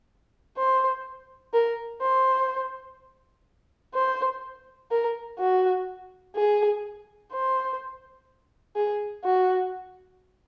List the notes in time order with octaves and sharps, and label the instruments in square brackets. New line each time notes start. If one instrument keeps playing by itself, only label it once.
[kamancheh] C5
A#4
C5
C5
A#4
F#4
G#4
C5
G#4
F#4